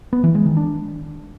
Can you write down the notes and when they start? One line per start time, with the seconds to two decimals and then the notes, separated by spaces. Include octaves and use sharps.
0.13 B3
0.24 E3
0.35 G#3
0.46 D#3
0.57 D4